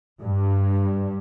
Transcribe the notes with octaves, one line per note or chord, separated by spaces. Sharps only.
G2